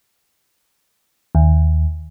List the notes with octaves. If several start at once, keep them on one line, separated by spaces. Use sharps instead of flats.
D#2